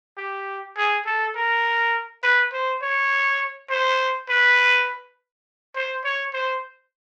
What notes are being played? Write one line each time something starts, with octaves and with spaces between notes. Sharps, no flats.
G4
G#4
A4
A#4
B4
C5
C#5
C5
B4
C5
C#5
C5